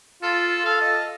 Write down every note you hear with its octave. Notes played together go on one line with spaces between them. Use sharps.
F4 A4
A4 F5
D#5